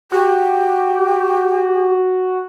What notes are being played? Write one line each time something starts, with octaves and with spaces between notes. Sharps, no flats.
F#4 G4